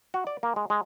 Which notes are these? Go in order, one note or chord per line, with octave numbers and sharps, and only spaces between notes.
F#4
D5
A#3
G#3
G#3